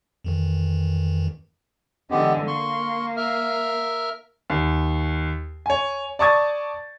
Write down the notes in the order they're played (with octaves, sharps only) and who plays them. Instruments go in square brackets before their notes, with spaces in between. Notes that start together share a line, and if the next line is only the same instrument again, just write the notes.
[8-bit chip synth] F2 D#3 E3
[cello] D3 E3 [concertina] G#3 B3 G4
[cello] A#3 [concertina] C6 C#6
[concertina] A#4 E5 F6
[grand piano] D#2
C#5 G#5
D5 A5 C#6 D#6 G#6 A6